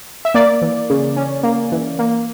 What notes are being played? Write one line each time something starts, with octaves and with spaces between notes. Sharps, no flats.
E5
A#3 D5
E3
C#3
C#4
A#3
E3
A#3